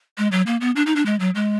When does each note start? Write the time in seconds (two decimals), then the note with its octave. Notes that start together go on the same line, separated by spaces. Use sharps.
0.18 G#3
0.32 F#3
0.47 A#3
0.61 B3
0.76 D4
0.86 D#4
0.96 D4
1.06 G#3
1.20 F#3
1.35 G#3